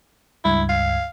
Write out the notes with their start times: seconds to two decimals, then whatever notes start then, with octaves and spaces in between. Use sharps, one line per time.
0.44 C#2 G2 E4 G#6
0.69 F5